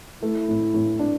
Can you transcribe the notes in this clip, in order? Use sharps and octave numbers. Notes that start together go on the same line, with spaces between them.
A3 E4
A2
A2
D4